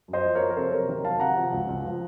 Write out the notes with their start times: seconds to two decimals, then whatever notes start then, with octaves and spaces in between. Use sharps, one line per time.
0.08 F#2
0.13 C5 D#5
0.25 F3
0.35 A#4 C#5
0.41 F3
0.50 A#4
0.57 C3 A4 C5
0.72 F#3 A#4 C#5
0.89 D#3 A#4
1.04 F#3 F5 A5
1.20 C3 F#5 A#5
1.36 F3
1.53 C#2
1.69 C#2
1.85 F3